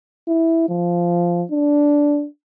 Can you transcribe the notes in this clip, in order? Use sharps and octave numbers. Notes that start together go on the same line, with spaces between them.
E4
F3
D4